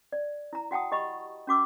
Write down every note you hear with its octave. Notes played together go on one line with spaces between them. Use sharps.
D5
E4 A#5
F#4 F#5 G5 A5 D#6
G4 D#5 B5 C#6
C#4 F#4 D6 E6